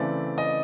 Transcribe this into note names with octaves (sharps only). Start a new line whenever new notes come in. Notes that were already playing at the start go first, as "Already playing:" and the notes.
Already playing: C#3 E3 A3 C4 D5
D#5